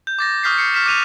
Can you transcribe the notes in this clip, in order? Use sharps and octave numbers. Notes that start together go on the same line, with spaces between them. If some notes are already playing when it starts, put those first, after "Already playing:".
G6
D6 A6 A#6
C#6 D#6 F6 G6 B6 C7
C7 C#7
C#6 F6 B6 E7
D6 F#6 D#7 F7